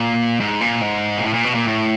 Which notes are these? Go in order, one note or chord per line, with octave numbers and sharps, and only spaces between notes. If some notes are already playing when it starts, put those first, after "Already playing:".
Already playing: A#2
G#2
A#2
G#2
A#2
A2
A#2
B2
A#2
A2